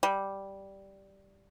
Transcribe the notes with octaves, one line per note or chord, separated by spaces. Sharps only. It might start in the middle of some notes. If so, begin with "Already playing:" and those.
G3